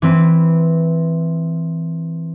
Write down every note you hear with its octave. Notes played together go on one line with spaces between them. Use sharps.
E3 C4 B4